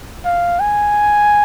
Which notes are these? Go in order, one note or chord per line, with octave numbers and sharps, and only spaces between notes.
F5
G#5